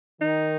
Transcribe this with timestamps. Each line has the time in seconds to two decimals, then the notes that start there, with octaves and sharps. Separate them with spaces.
0.21 D#3 D#4